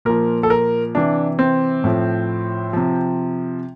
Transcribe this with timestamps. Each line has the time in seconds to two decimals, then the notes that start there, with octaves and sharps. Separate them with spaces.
0.05 A#2 F3 A#4
0.43 A4
0.50 A#4
0.95 C3 E3 D4
1.39 C4
1.84 A2 F3
2.73 C3 F3